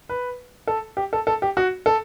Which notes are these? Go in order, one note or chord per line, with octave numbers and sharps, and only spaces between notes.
B4
A4
G4
A4
A4
G4
F#4
A4